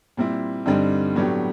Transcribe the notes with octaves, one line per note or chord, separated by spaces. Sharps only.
A#2 G3 C4 E4
G2 D3 G3 C4 D#4
A2 F#3 B3 D4 G4